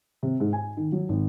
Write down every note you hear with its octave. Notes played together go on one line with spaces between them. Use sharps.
C3
G#2
G#5
D#3
F#3
G#1